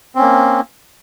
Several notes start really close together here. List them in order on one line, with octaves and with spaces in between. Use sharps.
C4 C#4 A#3